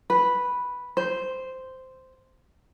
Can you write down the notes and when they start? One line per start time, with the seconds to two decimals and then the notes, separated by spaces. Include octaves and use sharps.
0.10 B4
0.97 C5